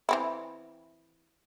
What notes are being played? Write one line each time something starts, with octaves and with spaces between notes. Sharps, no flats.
E3 C4 E4